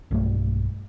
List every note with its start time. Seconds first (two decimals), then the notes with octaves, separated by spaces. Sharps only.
0.11 B1 G2 G3 A3